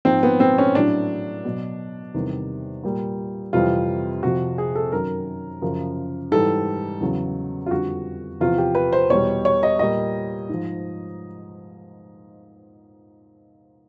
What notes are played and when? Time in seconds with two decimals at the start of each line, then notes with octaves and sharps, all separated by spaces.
0.05 G#2 F3 C4
0.23 B3
0.40 C4
0.58 C#4
0.75 A2 F#3 D4
1.45 B2 F#3
2.14 E2 C3 D#3 G3
2.84 A#2 G3
3.53 F2 C3 E3 G3 F4
4.23 F2 C3 F3 F#4
4.58 G#4
4.76 A4
4.92 F#2 D#3 F#3 A#4
5.62 F#2 C#3 F3
6.31 G#2 E3 G3 A4
7.01 E2 C#3 F#3
7.66 F4
7.70 F2 D3 G3 F#4
8.40 E2 C3 F3 F4
8.58 G4
8.75 B4
8.93 C5
9.10 E2 B2 G3 C#5
9.45 C#5
9.63 D#5
9.79 A#2 G3 D#5
10.49 G#2 F3